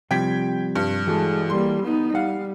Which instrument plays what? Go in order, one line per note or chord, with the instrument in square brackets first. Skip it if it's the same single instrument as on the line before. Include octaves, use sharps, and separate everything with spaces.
[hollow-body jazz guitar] C3 F3 G3 [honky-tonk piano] G5 G#6 B6
[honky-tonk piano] G2
[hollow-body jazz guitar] E3 F#4 A4 [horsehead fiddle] G#3
[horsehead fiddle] G3 A#3 [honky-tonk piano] C6
[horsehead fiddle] B3 D#4
[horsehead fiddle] G3 [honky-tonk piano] F5 [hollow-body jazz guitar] F#5